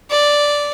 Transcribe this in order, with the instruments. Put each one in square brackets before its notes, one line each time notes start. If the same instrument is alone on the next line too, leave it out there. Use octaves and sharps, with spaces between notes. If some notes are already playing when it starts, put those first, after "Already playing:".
[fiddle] D5